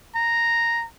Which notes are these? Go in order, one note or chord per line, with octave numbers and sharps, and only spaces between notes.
A#5